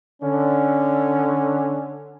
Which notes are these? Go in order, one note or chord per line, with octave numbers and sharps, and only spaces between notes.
D3 C#4